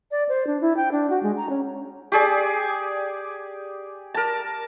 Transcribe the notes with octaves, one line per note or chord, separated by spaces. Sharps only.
D5
C5
D4
E4
G5
D4
F#4
G#3
A#5
C#4
G4 G#4 D5
A#4 A5